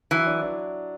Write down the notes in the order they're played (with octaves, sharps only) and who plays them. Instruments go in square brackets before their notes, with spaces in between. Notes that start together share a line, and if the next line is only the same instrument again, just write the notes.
[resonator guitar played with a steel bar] E3 [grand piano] F#3
[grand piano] D4
D4